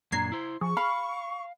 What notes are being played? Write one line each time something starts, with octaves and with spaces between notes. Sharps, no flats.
F#2 A#2 D4 A#5 G#6 C7
E4 C5
F3 G#4 C#6
F5 B5 F6